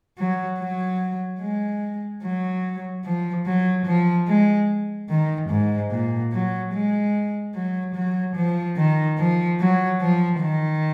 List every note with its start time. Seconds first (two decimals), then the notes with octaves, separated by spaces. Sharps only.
0.18 F#3
0.59 F#3
1.41 G#3
2.23 F#3
3.04 F3
3.46 F#3
3.86 F3
4.28 G#3
5.10 D#3
5.50 G#2
5.91 A#2
6.33 F#3
6.73 G#3
7.55 F#3
7.95 F#3
8.36 F3
8.77 D#3
9.18 F3
9.60 F#3
10.01 F3
10.41 D#3